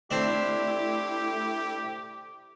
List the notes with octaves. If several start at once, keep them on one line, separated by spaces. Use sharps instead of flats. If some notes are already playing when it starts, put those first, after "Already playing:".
A3 C4 D4 E4 G4